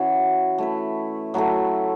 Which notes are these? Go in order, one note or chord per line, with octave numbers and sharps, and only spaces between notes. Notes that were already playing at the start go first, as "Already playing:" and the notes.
Already playing: E3 C#4 F#4
A3 E4 B4
F#3 A3 E4 A4